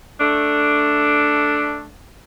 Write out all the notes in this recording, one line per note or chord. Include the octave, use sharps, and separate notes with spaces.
A3 D4